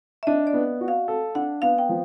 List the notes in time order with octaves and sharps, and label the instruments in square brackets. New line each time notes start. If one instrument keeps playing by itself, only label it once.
[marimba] E5
[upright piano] D4 [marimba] D#5
[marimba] D5
[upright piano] B3
F#4
[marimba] F5
[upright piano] A4
[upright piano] D4 [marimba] F#5
[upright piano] B3 [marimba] F5
[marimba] G5
[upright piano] F3